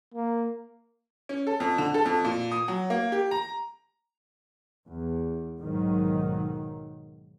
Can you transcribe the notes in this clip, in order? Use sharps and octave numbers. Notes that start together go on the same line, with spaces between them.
A#3
C#4
A4
F2
D3
A4
F2
A#2
D#6
F#3
A#3
G4
A#5
E2
B1 G#2 D#3 F#3